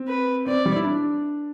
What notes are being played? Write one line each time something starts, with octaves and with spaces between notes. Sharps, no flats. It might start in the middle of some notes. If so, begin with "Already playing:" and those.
Already playing: C4
B4
C4 D5
G3
E4
D4